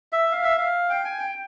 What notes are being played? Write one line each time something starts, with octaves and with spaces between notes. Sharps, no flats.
E5
F5
E5
F5
G5
G#5
G5